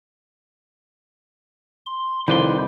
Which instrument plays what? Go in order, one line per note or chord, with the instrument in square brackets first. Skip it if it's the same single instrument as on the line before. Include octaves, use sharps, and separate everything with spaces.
[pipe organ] C6
[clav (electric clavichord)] C2 F2 D5 [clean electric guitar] D#3 B4 C6 [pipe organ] E4 C5